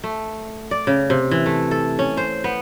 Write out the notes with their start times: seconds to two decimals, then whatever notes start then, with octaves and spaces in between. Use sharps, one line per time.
0.04 A3
0.71 D5
0.87 C#3
1.10 C3
1.31 E3
1.46 A3
1.71 A4
1.99 C#4
2.17 C5
2.44 B3